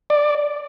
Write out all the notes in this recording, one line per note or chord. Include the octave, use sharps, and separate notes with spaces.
D5